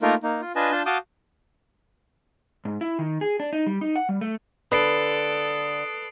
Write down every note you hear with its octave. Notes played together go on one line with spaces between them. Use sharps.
A3 A#3 D#4 F4 A#4
A#3 D#4
F4
D4 F4 B4 D#5 G#5 A5
D4 F4 A5 G6
F#4 F5 A5 D6 D#6 G6
G#2
E4
D#3
G#4
D4
D#4
G3
D#4
F#5
G3
A3
D3 A4 B4 D#6 C7 D7